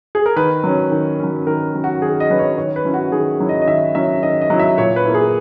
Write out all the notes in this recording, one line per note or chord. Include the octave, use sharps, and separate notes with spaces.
G#4
A#4
D#3 B4
F#3 C#4
D#3
F#3 C#4
D#3 A#4
F#3 C#4
F#4
D#3 G#4
D#5
F#3 C#4 B4
C#5
D#3 C#5
B4
F#3 C#4 E4
F#4
D#3 G#4
F#3 C#4 E4
D#5
D#5
D#3 E5
F#3 C#4 E4 E5
D#3 D#5
D#5
F#3 C#4 E4
E5
A#2 C#5
B4
A#3 E4
G#4